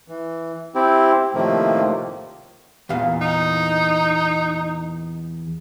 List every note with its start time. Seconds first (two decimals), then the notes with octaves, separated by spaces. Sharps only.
0.08 E3
0.75 C4 E4 G4
1.34 A2 C3 D#3 F3 A3 A#3
2.89 E2 A#2 F5
3.21 D#4